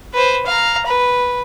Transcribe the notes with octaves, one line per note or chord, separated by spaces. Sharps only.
B4 C5
F5 A#5
B4